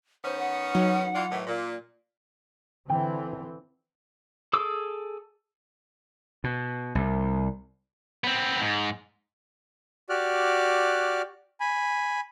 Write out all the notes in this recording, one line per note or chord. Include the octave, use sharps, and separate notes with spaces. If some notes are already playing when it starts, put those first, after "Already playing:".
D#3 B3 C#4 C5
F#5
F#3 D#4
E3 D4 F4
A2 D#3 E3
A#2
D3 E3 C4 G5
G#4 A4 D6 E6
B2
C2
B3 C4
G#2
F#4 G4 D5 F6 F#6
G#5 B5